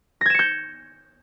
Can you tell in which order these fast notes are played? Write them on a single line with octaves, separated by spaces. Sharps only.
A#6 G#6 E7 C#7 G6